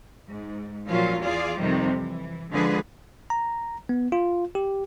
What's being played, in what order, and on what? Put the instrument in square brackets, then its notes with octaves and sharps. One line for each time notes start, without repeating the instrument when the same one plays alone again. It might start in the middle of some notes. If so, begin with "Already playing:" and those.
[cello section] G#2
A#2 F3 F#3 C#4 F4
E2 F4 G#4 D5 F5
F2 C3 D#3 F3 G3
E3
D3 F3 G#3 F4 G#4 B4
[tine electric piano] A#5
B3
F4
G4